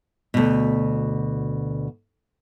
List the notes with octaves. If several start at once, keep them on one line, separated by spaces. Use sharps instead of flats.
D2 B2